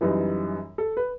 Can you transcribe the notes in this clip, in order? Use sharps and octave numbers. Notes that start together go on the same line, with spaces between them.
F#2 E3 G3 D#4 B4
A4
B4